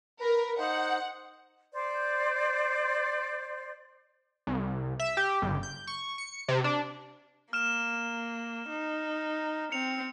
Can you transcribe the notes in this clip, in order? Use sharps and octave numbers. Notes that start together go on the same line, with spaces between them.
A#4 B4
D#4 C5 F#5
C5 D5
C2
E5
G4
G1
G6
C#6
C#7
C3
D4
A#3 F6 E7
D#4
C4 C#7 F7